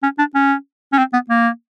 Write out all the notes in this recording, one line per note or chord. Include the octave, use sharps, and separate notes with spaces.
C#4
D4
C#4
C#4
C4
B3
A#3